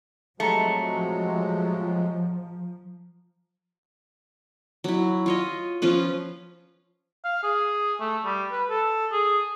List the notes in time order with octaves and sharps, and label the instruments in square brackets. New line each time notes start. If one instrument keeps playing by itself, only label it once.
[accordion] C3 F#3 G#3 [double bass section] F3 [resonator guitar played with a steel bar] A3 [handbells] A#5 C#7
[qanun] F#3 E4
F4 C#5 D#5
F3 C#4 F4 B4
[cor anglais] F5
G#4
A3
G3
B4
A4
G#4